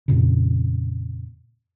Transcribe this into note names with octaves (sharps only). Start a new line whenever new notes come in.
F2 A#2 C#3